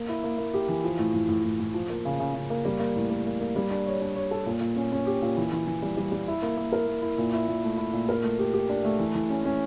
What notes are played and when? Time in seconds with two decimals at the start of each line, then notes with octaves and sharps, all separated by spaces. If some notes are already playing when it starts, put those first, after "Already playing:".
Already playing: A#3
0.09 E4
0.24 A#3
0.38 A#3
0.54 G4
0.68 E3
0.84 F3
0.99 A2
1.14 A2
1.29 A2
1.45 A2
1.59 A2
1.74 F3
1.90 A#3
2.05 C#3
2.20 C#3
2.34 C#3
2.50 A#3
2.65 G3
2.80 A#3
2.96 A2
3.11 A#3
3.26 A#3
3.40 A#3
3.56 G3
3.71 D4
3.86 C#5
4.02 D4
4.16 C#5
4.31 A4
4.46 A#2
4.61 A#2
4.76 C#4
4.92 C#4
5.07 G4
5.22 A#2
5.37 E3
5.52 E3
5.66 E3
5.83 G3
5.97 G3
6.12 G3
6.28 E4
6.42 A#3
6.57 A#3
6.73 A#4
6.87 A#3
7.02 E4
7.18 A#2
7.34 E4
7.48 A#2
7.64 A3
7.78 E4
7.93 A#2
8.09 A#4
8.23 A3
8.39 G4
8.54 G4
8.69 D4
8.85 A3
8.99 E3
9.14 E3
9.30 C#4
9.45 C#4